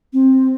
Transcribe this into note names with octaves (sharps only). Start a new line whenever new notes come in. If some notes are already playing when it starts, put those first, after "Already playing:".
C4